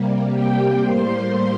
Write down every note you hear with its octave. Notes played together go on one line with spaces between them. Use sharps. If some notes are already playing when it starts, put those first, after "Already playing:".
Already playing: C3 G3 A#3
G4 G5
A2 G3 A#3 C5 C6